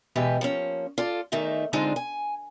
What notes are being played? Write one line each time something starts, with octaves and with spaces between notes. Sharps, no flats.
B2 E3 G#3 G4 B4
F3 A#3 C#4
F4 A4 D5
E2 D#3 A3 D#4 E5
D3 G#3 C4 D4 D#4 F4
G#5